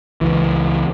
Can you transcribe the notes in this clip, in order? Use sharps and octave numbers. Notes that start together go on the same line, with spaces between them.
C#2 E3